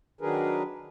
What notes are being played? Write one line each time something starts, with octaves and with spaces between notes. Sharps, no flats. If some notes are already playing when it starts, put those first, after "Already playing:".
D#3 F#3 D4 G#4 A#4 B4